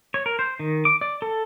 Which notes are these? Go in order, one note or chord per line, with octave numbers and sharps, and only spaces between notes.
C#5
A#4
C5
D#3
D6
D5
A4